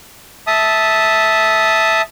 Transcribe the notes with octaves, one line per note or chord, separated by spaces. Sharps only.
E5 A5 D#6